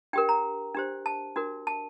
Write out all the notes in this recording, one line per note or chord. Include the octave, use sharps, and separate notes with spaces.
D4 G4 A#4 G5
A#5
D4 G4 C5
A5
D4 F#4 A#4
A5